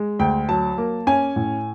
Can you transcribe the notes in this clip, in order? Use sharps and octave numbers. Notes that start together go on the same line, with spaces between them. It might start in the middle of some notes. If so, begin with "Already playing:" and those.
Already playing: G#3
D2 G5
F#3 A5
A#3
C#4 G#5
A2